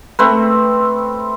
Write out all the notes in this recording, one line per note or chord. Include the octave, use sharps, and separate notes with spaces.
A3 C4 B4